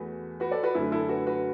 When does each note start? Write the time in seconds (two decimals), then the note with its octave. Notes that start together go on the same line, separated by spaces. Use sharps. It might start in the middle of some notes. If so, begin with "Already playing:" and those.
Already playing: E2 E3 A3 F#4 B4
0.40 F#4 B4
0.51 A4 D5
0.63 F#4 B4
0.75 F#2 D3 A3 E4
0.92 E4 A4
1.09 F#4 B4
1.26 F#4 B4